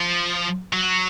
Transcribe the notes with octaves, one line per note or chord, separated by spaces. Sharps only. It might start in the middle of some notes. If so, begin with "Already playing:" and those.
Already playing: F3
F#3